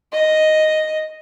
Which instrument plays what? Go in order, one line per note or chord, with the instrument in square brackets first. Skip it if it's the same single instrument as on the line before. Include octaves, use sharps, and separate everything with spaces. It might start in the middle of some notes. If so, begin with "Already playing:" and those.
[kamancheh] D#5